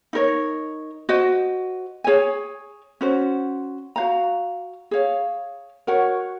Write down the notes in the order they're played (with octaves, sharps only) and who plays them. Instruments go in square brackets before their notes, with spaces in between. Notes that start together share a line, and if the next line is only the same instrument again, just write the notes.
[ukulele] D#4 A#4 C#5
F#4 C5 D#5
G#4 C#5 G#5
C#4 F#4 C5
F#4 C5 F5 A#5
G#4 C#5 F5
F#4 A#4 C#5 F#5